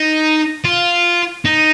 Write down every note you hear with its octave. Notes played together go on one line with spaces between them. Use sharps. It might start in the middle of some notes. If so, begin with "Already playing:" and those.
Already playing: D#4
F4
D#4